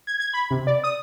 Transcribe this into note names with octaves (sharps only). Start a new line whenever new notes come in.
G#6
G#6
B5
C3
D5
D#6